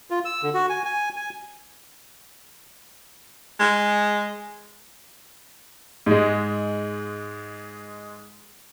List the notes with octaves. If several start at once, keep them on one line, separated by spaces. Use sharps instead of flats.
F4
E6
D3
F#4
G#5
G#5
G#5
G#3
G#2 G#3